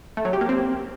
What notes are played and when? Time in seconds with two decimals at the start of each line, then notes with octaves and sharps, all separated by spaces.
0.17 A3
0.25 F#3
0.33 G4
0.41 A#3
0.49 C4